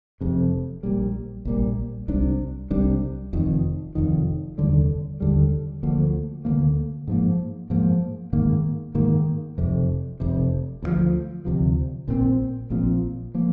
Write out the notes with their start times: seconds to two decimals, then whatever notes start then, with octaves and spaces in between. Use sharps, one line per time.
0.21 F1 F2 C3
0.83 A#1 A#2 G3
1.45 A#1 A#2 G3
2.08 C2 C3 G3 D4
2.70 C2 C3 G3 D4
3.33 F1 F2 D#3
3.95 F1 F2 D#3
4.58 F1 D#2 D3 G3
5.20 F1 D#2 D3 G3
5.83 D2 D3 F3 A#3
6.45 D2 D3 F3 A#3
7.07 G#2 F3 A#3
7.70 G#2 F3 A#3
8.33 G#2 D#3 A#3
8.95 G#2 D#3 A#3
9.58 F1 F2 C3
10.20 F1 F2 C3
10.82 D2 C3 F3
11.45 D2 C3 F3
12.08 A#1 A#2 F3 C4
12.70 A#1 A#2 F3 C4
13.34 F3 A#3